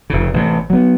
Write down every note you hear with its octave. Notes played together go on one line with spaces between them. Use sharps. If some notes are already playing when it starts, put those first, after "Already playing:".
F1 C#3
A1 C3
F#3 B3